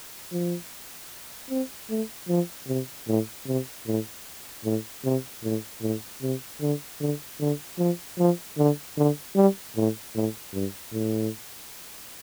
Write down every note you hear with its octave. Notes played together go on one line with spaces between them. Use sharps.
F3
C4
A3
F3
C3
A2
C3
A2
A2
C3
A2
A2
C3
D3
D3
D3
F3
F3
D3
D3
G3
A2
A2
G2
A2